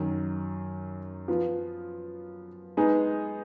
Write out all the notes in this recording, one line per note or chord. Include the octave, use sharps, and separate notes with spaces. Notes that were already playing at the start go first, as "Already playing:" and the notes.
Already playing: F#2 D#3 F#3
F3 B3 F4
G#3 B3 D#4 G#4